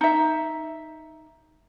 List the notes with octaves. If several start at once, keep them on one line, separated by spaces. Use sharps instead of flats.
D#4 E5